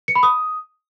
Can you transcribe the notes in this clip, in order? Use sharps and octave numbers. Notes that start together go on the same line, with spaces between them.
C#7
B5
D#6